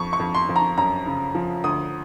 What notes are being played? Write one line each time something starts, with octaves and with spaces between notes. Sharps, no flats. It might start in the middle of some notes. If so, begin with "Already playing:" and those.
Already playing: F2 C#6
C#6
F2
C6
F2
A#5
F#2 A#5
C#3
F3
D2 D#6